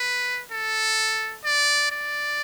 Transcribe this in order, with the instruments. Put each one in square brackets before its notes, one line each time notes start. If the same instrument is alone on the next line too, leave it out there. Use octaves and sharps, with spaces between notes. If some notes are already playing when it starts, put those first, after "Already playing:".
Already playing: [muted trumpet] B4
A4
D5
D5